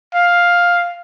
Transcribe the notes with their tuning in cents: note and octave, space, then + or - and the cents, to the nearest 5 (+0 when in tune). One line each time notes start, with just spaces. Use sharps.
F5 +5